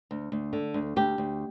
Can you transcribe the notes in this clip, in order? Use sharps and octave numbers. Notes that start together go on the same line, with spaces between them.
D2
D2
D3
D2
D2 G4
D2